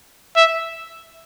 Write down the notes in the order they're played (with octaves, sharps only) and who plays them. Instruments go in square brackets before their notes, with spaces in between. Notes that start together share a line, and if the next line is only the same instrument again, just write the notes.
[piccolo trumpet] E5